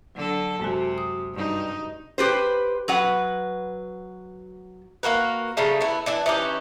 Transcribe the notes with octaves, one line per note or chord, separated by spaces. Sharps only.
D3 F#3 A4
F#2 C3 G#3 F#4
D#6
G2 D#4
G4 B4 C5
F#3 B4 F#5
A#3 F#4 A#4 B4
C#3 F#3 G3 A3
B3 E4
E3 D4 E4
E3 C#4 D#4 G4